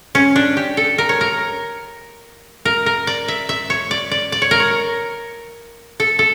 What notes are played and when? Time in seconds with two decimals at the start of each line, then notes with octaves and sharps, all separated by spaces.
0.15 C#4
0.36 D4
0.57 G4
0.77 A4
0.98 A#4
1.09 C#5
1.21 A#4
2.65 A#4
2.86 A#4
3.07 D5
3.28 E5
3.49 E5
3.70 C#5
3.91 D5
4.11 D5
4.32 D5
4.42 C#5
4.51 A#4
4.60 C#5
6.00 A4
6.19 A4